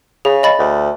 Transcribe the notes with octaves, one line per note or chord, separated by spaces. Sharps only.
C#3 G#4
D#5 B5 A6
D2